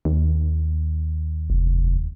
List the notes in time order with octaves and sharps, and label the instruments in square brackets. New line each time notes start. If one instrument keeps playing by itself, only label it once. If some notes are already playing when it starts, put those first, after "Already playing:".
[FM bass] D#2
[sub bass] F1